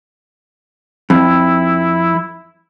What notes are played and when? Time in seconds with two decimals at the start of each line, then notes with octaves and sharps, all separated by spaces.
1.10 F2 E4